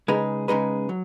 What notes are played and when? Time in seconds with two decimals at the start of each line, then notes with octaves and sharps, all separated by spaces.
0.08 C#3 G#3 D#4 G#4 B4
0.48 C#3 G#3 D#4 G#4 B4
0.89 F#3